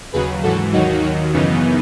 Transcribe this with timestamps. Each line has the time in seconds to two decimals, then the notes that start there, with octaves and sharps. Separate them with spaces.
0.13 D#2 C#3 F#3 G#4 B4
0.43 G#2 E3 F#4 A4
0.73 D#2 D#3 F#3 D#4 F#4
1.03 D#2 D#3 F#3
1.33 F#2 C#3 E3 B3 D#4